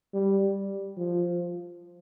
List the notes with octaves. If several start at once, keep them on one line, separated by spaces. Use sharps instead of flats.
G3
F3